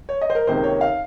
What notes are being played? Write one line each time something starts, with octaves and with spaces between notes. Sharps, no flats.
C#5
D#5
C5
A#4
C#2 C3 D#3 A#3 C5
C#5
F5